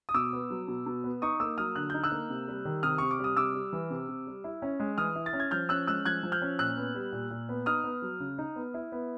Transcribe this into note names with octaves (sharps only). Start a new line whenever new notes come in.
D#6
B2 D6 E6
B3
F#3
B2
B2
B3
D#4 C#6 D#6
A#3 D6 E6
F#3 D#6 F6
D3 F#6
D#4 G6
E6 F#6
A#3
C3
G3
D#3
C3 D#6 F6
C3 C#6
D6
G3 D#6
C3 D6 E6
G3
E3
C3
C3
G3
E4
C#4
G#3
E3 D#6 F6
E4
A6
C#4
G#6
F3 F6 G6
C#4 E6 F#6
G#3 E6 F#6
F3 F#6 G#6
F3
F6 G6
C#4
A#2 E6 F#6
B3
G3
A#2
A#2
B3
D#4 D#6 F6
B3
F#3
C#3
D#4
B3
E4
B3